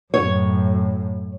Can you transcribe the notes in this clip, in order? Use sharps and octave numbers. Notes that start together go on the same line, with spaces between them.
F#2 A2 C#5